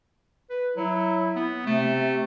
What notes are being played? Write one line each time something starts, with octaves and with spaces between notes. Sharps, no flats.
B4
F#3 E4
B3
C3 A3